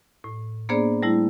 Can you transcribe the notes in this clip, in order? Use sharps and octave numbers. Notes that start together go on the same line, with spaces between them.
A2
A#3 B3 D4 G#4 C5 D5
G3 A3 E4